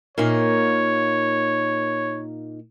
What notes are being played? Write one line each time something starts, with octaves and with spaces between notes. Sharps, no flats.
A#2 A#3 D#4 C#5